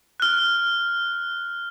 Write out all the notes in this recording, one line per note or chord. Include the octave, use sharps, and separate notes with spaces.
F6 F#6